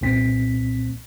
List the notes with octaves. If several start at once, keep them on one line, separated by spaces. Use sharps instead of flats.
C2 A#2 C4 B6